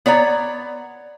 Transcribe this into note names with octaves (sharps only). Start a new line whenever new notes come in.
B3 C#5 D5 A#5